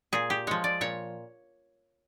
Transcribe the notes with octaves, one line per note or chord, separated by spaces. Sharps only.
A#2 G#4
G4
F3 G#3 C#5
D5
A#2 C#5